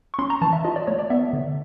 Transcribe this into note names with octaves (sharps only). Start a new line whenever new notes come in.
C#6
C#4 C6
A#5
E3 A5
E5
F4 D#5
D5
A3 C#5
D5
B3 E5
D3